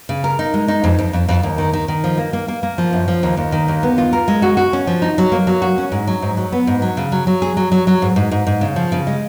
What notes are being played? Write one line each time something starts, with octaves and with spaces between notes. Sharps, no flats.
C#3
A#4
D#4
G#3
D#4
F2
F2
F2
F2
D#2
D#3
D#3
D#3
F3
A#3
A#3
A#3
A#3
F3
F#2
F3
D#2
D#2
D#3
D#2
B3
F4
A#4
G#3
F#4
F#4
C#4
F3
D#4
F#3
A#3
F#3
F#4
C#4
G#2
F#3
G#2
F#3
B3
G#2
F#3
C#3
F#3
F#3
G#4
F#3
F#3
F#3
G#2
G#2
G#2
G#2
C#3
F3
C#3
G#3